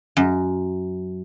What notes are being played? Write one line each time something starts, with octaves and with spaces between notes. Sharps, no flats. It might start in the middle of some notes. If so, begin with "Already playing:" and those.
F#2